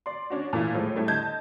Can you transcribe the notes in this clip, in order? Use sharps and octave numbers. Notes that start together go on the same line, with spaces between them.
D5 C6
C#4 D4 F#4
A#2 E3 A3 E4 F5
A2 F3 G#3 A3
G3 A3 E4
D3 D#5 A5 G6 G#6